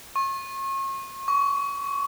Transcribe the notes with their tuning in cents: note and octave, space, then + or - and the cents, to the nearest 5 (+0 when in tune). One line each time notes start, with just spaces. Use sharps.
C#6 -40
C#6 +30